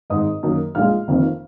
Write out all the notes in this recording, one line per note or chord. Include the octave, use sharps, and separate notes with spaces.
G#1 G#2 D#3 D#5 D#6
F#2 D#3 A#3 C#4
A#1 A#2 G#3 F5 F6
F1 F2 D#3 A#3